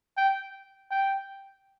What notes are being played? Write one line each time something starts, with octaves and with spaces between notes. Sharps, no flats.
G5
G5